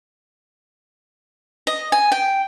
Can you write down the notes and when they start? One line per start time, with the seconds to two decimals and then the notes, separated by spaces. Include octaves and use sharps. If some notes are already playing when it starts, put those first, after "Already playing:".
1.67 D#5
1.92 G#5
2.12 G5